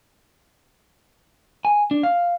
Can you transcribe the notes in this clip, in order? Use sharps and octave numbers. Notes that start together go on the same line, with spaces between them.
G#5
D4
F5